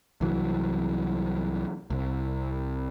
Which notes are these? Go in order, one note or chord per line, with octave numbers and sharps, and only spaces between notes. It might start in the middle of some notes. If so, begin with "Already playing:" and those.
C2 E3 F#3
C2